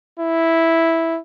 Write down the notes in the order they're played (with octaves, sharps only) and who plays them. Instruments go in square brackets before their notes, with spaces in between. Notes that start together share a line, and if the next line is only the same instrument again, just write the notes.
[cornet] E4